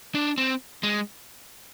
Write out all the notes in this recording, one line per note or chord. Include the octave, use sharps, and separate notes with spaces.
D4
C4
G#3